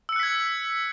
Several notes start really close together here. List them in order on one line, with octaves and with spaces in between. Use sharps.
E6 C#7 F#6 B6 G#6